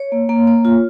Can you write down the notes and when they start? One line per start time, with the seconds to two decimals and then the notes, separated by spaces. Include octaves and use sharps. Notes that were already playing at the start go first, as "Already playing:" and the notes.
Already playing: C#5
0.12 A#3
0.29 A#3
0.47 A#3
0.65 F4